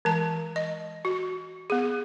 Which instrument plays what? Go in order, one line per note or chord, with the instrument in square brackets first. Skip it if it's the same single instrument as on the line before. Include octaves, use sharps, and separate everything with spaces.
[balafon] E3 G#3 A5
D#5
F#4
B3 G#4